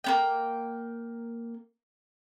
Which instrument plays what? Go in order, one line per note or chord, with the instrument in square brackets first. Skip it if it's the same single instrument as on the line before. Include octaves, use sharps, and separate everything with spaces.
[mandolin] A#3 B3 G5